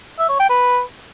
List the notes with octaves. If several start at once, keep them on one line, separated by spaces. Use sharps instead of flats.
E5
C#5
G5
B4